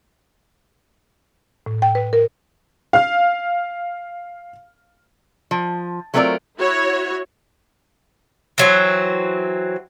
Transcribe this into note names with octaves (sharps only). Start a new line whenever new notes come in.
A2
G5
B4
A#4
F5 F6
F3
F#3 A3 C4 F4 A#4 D5
E4 F#4 C#5
E3 F#3 C4